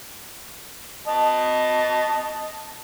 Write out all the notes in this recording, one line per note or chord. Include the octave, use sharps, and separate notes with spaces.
D#5 A5